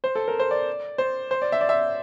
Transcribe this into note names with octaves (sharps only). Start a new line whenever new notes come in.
C5
A4
A#4
C5
D5
C5
C5
D5
E5
D5
E5